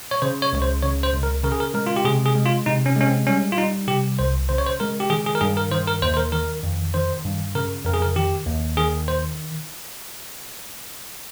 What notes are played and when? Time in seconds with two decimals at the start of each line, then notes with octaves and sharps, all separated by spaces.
0.11 C#5
0.22 C#3 C5
0.42 C#5
0.53 C#2 C#5
0.62 C5
0.83 C#3 C#5
1.03 C5
1.13 C#2
1.23 A#4
1.43 C#3 A#4
1.52 G#4
1.60 A#4
1.74 G#3 A#4
1.87 F4
1.96 G4
2.05 C3 G#4
2.26 G#4
2.35 G#3
2.46 F4
2.66 C3 D#4
2.86 C#4
2.96 G#3 C#4
3.07 C4
3.27 G3 C#4
3.52 F4
3.58 G3 D#4
3.88 C3 G4
4.19 C2 C5
4.49 C#3 C5
4.58 C#5
4.66 C5
4.80 G#3 A#4
5.00 G4
5.10 D#3 G#4
5.26 G#4
5.35 A#4
5.41 G2 G#4
5.57 A#4
5.71 D#3 C5
5.87 A#4
6.02 D#2 C5
6.14 C5
6.17 A#4
6.32 D#3 A#4
6.63 F2
6.94 D#3 C5
7.25 G2
7.55 C#3 A#4
7.85 F2 A#4
7.94 G#4
8.02 A#4
8.16 D#3 G4
8.46 D#2
8.77 D#3 G#4
9.08 C5